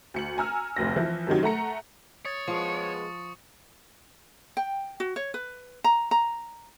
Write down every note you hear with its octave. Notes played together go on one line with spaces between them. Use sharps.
D2 C#7 F#7
G#5 A#5 E6 F6
F1 D2 A#6
E3 F3 E4
F#2 C3 D#3 F#3
A3 F#5 A#5 C#7
C#5 D#6 A6 C#7
F3 G#3 B3 F5 C#6
G5
F#4
C#5
B4
A#5
A#5